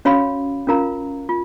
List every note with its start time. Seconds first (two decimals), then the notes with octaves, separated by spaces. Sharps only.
0.05 C#4 F#4 C#5 F5 B5
0.67 C#4 F4 A#4 F5 A#5
1.29 F4